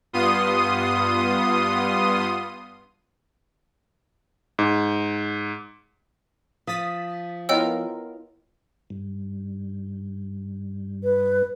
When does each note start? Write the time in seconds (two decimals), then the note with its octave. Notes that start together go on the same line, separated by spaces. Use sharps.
0.13 G2 B3 F4 C6 D#6 D#7
4.59 G#2
6.67 F3 D#6 A6 B6
7.49 B3 E4 F4 A#4 C#5 D#5 G5 E6
8.90 G2
11.04 B4